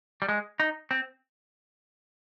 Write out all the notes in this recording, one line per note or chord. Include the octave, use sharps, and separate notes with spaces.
G3
G#3
D#4
C4